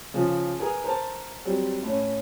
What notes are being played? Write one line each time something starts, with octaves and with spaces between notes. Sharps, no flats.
C#3 F3
G#4 A#4 B4 G#5
A#4 C5 A5
F#3 G3 C4
A2 C#4